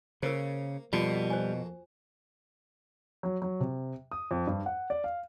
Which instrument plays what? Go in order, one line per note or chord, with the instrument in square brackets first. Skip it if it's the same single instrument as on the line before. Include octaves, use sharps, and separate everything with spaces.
[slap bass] C#3 [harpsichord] A#3 [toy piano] A#4 C5
[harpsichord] F2 A#3 A5 [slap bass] B2 [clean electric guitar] G3 [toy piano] F4 F#4
[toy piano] C5 G#5
[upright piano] F#3
F#3
C3
D#6
F2
G2
F#5
D5
F5